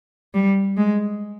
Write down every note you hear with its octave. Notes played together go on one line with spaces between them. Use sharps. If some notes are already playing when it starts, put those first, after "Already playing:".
G3
G#3